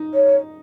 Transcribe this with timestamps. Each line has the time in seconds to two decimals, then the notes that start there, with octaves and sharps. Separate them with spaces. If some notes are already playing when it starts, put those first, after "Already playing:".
Already playing: D#4
0.14 C#5